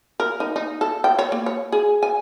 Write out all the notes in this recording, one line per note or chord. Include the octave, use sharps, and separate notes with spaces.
A#4
D#4
D#4
A4
G5
C#5
A#3
C#5
G#4
G#5